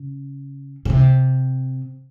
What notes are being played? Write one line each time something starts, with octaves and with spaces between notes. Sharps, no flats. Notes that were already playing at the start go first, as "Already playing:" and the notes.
Already playing: C#3
C#3
C3